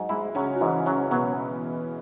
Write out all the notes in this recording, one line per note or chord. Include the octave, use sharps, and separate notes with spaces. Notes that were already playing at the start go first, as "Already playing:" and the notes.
Already playing: G#2 F#3
G#3 E4
C#3 F#3 C#4
F#4
G#2 E3 E4
C#3 F#3 C#4
B2 F#3 B3